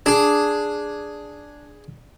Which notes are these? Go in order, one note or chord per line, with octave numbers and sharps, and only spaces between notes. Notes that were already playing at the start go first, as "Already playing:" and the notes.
D4 G#4